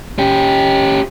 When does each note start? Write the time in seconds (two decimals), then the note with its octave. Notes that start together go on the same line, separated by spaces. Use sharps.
0.19 C#4 G4